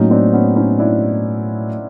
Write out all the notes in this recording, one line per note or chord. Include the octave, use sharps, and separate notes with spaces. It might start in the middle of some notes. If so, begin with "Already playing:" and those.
Already playing: A2 F#3 A#3 C#4 D#4
C4 D4
B3 C#4
C#4 D#4
D4 E4